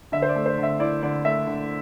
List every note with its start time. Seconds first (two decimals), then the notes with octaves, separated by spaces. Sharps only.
0.12 D3 E5
0.22 C5
0.29 D5
0.36 A3
0.46 C5
0.58 D3
0.63 E5
0.79 E4 D5
1.02 D3 D5
1.25 A3 E5
1.47 D3